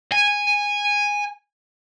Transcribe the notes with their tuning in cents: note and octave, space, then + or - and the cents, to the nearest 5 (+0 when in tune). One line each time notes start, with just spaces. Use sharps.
G#5 -10